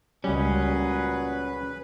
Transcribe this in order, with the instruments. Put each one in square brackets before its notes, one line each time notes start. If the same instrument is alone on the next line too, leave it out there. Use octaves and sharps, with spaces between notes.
[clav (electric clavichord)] C#2 G3 [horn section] A#2 F#4 G#4 [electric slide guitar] C#4 [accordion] B4